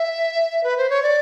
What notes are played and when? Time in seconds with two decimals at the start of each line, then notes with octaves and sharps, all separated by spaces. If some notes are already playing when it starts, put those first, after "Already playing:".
Already playing: E5
0.64 B4
0.78 C5
0.90 C#5
1.03 D5